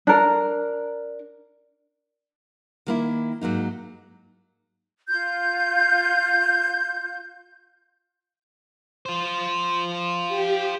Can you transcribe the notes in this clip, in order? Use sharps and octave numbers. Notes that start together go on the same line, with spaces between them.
D4 A#4
D#3 A#3 E4
G#2 F#3 A#3 D#4
F4 G6
F4 C5
G4